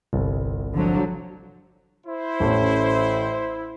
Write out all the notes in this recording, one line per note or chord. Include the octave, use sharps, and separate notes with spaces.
G1 C2
D3 F3 F#3
E4 C5
A1 A3 C#4